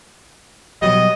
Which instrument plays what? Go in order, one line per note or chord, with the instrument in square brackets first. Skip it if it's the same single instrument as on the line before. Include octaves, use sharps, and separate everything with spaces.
[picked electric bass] B2 F#3 G3 [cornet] D#5